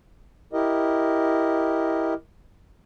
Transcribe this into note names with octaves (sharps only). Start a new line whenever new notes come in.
E4 G4 A#4 D#5